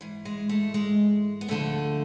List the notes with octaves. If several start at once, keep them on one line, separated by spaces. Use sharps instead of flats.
G#2 E3
G#3
A3
G#3
B3
D2 D3 F3 A3